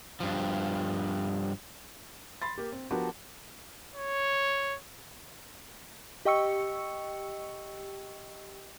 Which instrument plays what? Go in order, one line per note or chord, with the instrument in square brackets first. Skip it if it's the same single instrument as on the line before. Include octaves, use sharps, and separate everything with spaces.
[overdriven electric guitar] G2 F3
[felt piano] B5 C6 A6
A#3 G4
C4
F3 B3 D4 F#4 G4 A#4
[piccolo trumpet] C#5
[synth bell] G4 D#5 G5 C#6 E6 C#7